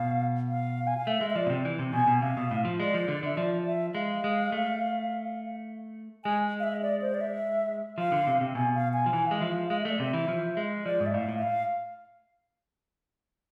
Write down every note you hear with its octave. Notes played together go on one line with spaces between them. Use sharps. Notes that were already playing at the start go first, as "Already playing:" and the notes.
Already playing: B2 F5
F5
G#5
F5
A3 E5
G#3
E5
F3 D5
B2
C3
E3
C3
B2 G#5
B2
C3 F5
B2
A2
F3
G#3 D5
F3
D3
D3 E5
F3 D5
E5
G#3 F5
G#3
A3
G#3 G#5
F5
E5
D5
C5
D5
E5
F3 F5
D3
C3
C3
B2 G#5
F5
G#5
F3
E3 G#5
G#3 F5
F3 E5
F5
G#3 F5
A3 E5
D5
C3 E5
E3
F3
G#3
F3 D5
G#2
E5
A2 F5
A2
E5
F5